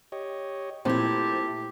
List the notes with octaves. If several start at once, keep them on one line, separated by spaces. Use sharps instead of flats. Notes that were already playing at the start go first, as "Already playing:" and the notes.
G4 C#5 D#5
A#2 A3 C4 E4 G4 A5